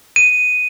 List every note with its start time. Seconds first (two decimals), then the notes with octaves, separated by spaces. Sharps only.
0.16 D#7